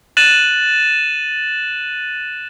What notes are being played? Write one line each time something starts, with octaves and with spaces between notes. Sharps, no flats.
F#6 A6 D#7 E7 F#7